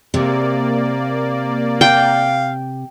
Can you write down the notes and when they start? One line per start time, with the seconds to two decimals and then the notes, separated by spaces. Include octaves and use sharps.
0.14 C3 A#3 D5
1.81 F5 G5